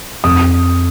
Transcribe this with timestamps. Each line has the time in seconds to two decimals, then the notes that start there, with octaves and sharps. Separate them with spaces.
0.24 F2 D#6